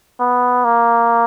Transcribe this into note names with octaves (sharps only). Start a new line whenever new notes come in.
B3
A#3